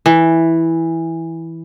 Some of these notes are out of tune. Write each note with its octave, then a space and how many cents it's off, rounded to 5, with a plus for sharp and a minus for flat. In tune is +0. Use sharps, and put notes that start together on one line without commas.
E3 -5